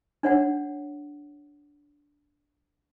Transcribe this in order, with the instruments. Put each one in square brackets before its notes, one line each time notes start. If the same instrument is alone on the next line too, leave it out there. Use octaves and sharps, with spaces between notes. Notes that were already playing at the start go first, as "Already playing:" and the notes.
[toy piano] D4 C#5 F#5